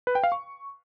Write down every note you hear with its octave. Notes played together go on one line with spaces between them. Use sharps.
B4
G5
F5
C#6